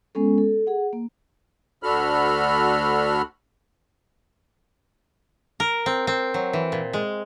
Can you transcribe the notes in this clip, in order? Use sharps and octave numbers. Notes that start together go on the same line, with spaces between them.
G#3 B3 C#4 A4
A4
G#4 F#5
A#3
D2 D4 F#4 A4 B5 F6
A#4
C4
C4
F#3
E3
A#2
G#3